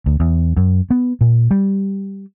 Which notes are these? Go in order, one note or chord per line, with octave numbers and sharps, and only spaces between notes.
D2
E2
F#2
B3
A#2
G3